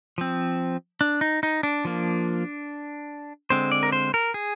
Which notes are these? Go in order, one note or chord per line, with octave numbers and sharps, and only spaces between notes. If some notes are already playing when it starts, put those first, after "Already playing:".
F3 C4
D4
D#4
D#4
D4
F3 A#3
D3 G#3 C4 C5
D5
A#4
C5
A#4
G#4